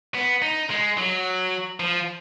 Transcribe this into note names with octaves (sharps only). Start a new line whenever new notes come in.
B3
D#4
G#3
F#3
F3